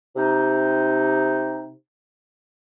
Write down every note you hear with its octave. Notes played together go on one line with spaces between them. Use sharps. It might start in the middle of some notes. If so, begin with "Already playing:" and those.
C3 D#4